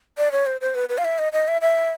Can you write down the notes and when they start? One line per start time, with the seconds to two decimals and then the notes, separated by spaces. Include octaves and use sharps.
0.18 D5
0.32 C#5
0.46 C5
0.61 C5
0.75 B4
0.89 B4
0.98 F5
1.05 E5
1.18 D#5
1.33 D#5
1.48 E5
1.61 E5